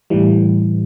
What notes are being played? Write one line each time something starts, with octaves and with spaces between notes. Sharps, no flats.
A2 E3 G3